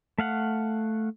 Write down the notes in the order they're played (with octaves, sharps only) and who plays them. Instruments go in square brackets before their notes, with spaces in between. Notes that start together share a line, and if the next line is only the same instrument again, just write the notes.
[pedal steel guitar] A3 F5 F#5